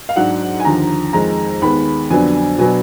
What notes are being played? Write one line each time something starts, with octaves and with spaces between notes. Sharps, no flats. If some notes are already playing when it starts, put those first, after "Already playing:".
F5
G#2 F#3 D4 F#5
G#5
D#2 D3 F3 A#5
F2 D#3 G#3 A#5
D#2 D#3 G#3 B3 B5
F2 D3 F#3 B3 D4 G#5
B2 F#3 B3 D4 G#5